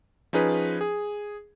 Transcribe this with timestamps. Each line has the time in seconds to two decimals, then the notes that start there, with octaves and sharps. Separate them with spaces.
0.33 F3 C#4 D#4 G#4 B4
0.81 G#4